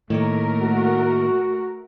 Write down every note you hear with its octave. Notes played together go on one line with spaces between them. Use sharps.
A2 D#3 A3 A#3 A#4 C#5
F#4